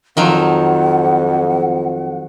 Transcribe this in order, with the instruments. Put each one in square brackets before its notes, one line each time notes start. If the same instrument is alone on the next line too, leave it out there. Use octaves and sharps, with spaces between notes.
[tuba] F2 [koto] D#3 F3 F#3 [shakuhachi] F#5